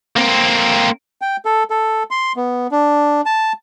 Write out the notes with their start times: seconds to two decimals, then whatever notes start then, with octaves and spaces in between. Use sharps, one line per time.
0.16 A#3 C4
1.22 G5
1.45 A4
1.70 A4
2.11 C6
2.36 B3
2.72 D4
3.26 A5